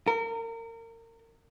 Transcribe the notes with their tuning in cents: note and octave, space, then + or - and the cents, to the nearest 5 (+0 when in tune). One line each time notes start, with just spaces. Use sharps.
A#4 -30